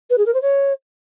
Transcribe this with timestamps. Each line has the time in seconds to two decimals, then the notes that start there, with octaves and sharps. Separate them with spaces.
0.10 B4
0.17 G#4
0.25 A#4
0.33 C5
0.41 C#5